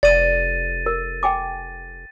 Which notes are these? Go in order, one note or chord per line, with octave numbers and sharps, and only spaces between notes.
F1 D5 A6 D#7
A#4
G5 G#5 D6